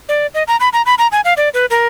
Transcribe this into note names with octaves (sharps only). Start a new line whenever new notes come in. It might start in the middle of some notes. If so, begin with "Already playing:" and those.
D5
D#5
A#5
B5
A#5
B5
A#5
G#5
F5
D5
B4
A#4